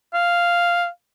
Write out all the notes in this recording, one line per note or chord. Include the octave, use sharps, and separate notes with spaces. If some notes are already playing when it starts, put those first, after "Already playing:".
F5